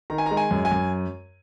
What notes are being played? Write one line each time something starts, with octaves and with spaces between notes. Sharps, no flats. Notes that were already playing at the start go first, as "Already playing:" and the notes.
D#3 A#5
G#5
G#3 A#5
G#5
F#2
G#5
F#2